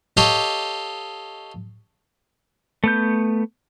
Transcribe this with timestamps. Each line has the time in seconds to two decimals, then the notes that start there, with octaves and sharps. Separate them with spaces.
0.17 G4 A4 C#5 D#5 F5
2.84 A3 B3 G6